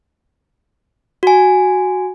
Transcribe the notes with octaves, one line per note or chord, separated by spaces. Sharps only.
F#4 G#5